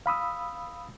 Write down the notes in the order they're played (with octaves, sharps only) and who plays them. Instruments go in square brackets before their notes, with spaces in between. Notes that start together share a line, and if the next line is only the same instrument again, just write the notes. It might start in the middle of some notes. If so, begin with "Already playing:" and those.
[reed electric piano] F5 B5 D#6 E6